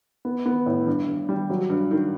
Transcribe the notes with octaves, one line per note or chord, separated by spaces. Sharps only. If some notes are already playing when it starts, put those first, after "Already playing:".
B3
B3
A2
G2
G2
G3
F#3
G2
D#3